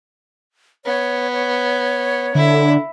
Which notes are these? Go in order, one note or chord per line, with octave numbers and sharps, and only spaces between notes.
B3 C#5
C#5
D3 E4